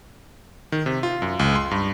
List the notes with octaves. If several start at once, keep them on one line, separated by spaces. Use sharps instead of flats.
D#3
C3
F4
F#2
C#2
C6
G2